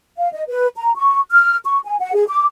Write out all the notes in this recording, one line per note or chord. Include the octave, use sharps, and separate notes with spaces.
F5
D#5
B4
A#5
C#6
F6
C#6
G#5
F#5
G#4
D6